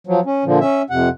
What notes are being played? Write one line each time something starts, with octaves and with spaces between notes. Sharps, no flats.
F3 F#3
C#4
A#2 D3 F3
C#4 E5
F2 C3 F#5